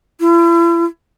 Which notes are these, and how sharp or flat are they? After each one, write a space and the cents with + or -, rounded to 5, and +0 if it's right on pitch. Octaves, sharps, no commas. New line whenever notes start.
E4 +40